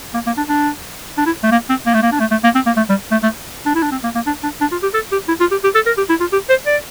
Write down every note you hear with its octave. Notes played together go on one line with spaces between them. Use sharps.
A#3
A#3
D4
D4
D4
E4
A3
A#3
C4
A#3
A3
A#3
D4
A3
A3
A#3
C4
A#3
A3
G3
A3
A3
D4
E4
D4
C4
A#3
A#3
D4
D4
D4
F4
G4
A4
G4
E4
F4
G4
G4
A4
A#4
G4
E4
F4
G4
C5
D5